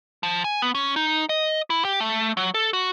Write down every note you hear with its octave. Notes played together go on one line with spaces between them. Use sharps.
F3
G#5
B3
C#4
D#4
D#5
E4
G4
A3
F#3
A4
F#4